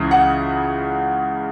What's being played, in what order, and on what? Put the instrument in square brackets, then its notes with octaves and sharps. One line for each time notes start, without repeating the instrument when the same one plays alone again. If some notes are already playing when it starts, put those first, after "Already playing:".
Already playing: [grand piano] C#2 C#3 E3
F#5